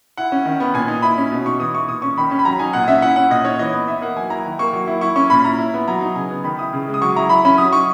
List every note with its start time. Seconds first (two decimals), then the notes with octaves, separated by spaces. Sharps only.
0.17 E4 F#5
0.32 C#4
0.45 D#3
0.60 B3
0.74 A#2 G#5
0.88 D#4
1.02 E4 B5
1.17 C#4
1.32 B2
1.46 D#4 C#6
1.60 E3 D#6
1.74 E4 C#6
1.88 A#2 D#6
2.02 C#4 C#6
2.17 D#3 B5
2.31 C#4
2.39 B5
2.45 F#3 A#5
2.59 D#4 G#5
2.73 A#2 F#5
2.88 C#4 E5
3.02 E4 F#5
3.16 C#4 F#5
3.30 A#2 D#5
3.45 D#4 C#5
3.59 E3 D#5
3.73 B3 D#5
3.88 D#4 E5
4.02 A#3 F#5
4.17 F#3 G#5
4.30 E4 A#5
4.46 D#3
4.59 A#3 C#6
4.73 F#3
4.87 E4
5.01 E4 C#6
5.16 C#4 C#6
5.30 A#2 B5
5.44 E4 A#5
5.58 E4
5.74 B3
5.88 F#3 A#5
6.01 D#4
6.15 C#3 G#5
6.31 B3
6.44 D#3 B5
6.59 E4 D#6
6.73 C#3
6.88 G#3
6.94 D#6
7.01 F#3 C#6
7.16 E4 A#5
7.29 E4 B5
7.45 C#4 B5
7.58 F#3 D#6
7.73 D#4 C#6